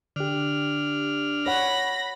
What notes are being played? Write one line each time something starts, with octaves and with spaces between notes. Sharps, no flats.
D3 D4 G4 F6
C#5 F#5 B5 A#6